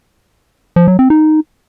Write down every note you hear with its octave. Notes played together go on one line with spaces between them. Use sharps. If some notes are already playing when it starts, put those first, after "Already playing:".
F3
F#3
C4
D#4